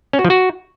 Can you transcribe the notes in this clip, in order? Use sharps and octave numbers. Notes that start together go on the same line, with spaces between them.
C#4
F#4
F3
F#4